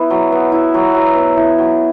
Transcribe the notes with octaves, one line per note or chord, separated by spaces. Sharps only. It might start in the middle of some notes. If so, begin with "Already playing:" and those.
Already playing: B3 E4
F#3
B3
E4
F#3
F#3
B3
E4
F#3